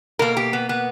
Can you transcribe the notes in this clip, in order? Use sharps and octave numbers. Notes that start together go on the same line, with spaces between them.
B2 A#3 A#4
G4
B3
B3